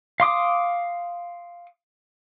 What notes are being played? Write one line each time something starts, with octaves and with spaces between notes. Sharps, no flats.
F5 C6 D6 D#6